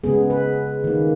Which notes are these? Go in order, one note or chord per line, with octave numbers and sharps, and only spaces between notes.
C#3 G#3 B3 G#4
B4
D#3 A#3